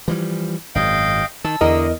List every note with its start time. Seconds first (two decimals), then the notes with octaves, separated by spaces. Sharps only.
0.08 E3 F3 G3
0.75 G#1 F#2 D#5 F5 G5
1.44 D#3 A5 E6
1.61 E2 D3 A#4 D#5